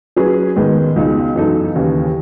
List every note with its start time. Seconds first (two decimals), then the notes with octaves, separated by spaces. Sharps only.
0.16 F#3 C#4 G#4 B4
0.56 G#2 D#3 G#3 B3
0.96 C#2 B2 G#3 D#4
1.36 F#2 E3 B3 D#4 A4
1.76 D#2 C#3 E3